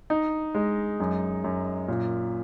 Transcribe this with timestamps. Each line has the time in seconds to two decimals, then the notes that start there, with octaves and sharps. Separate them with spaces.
0.10 D#4
0.55 G#3
1.00 F#2
1.44 F#2
1.88 A#2